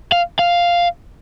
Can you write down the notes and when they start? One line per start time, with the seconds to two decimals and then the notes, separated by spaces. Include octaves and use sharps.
0.12 F5
0.39 F5